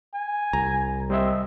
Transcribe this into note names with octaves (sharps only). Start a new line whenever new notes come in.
G#5
C2 A#5
G3 C4 D#5 E5